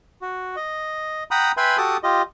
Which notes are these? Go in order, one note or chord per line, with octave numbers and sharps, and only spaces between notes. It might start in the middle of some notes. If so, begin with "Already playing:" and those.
F#4
D#5
F#5 G5 A#5 B5 D#6
B4 E5 G5 G#5 B5 C6
F#4 G4 A4 A5 D6 D#6
F4 G4 D#5